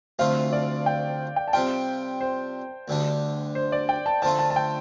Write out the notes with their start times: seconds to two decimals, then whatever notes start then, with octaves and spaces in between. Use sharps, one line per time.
0.19 D2 C3 F3 A3 F4 F5
0.53 D5
0.86 G5
1.36 G5
1.48 A5
1.53 C3 G3 F4 G5
2.21 C5
2.88 D2 D3 G3 D4
3.55 C5
3.72 D5
3.89 G5
4.06 A5
4.22 D3 F3 A3 F4 A5
4.39 A5
4.50 A5
4.56 G5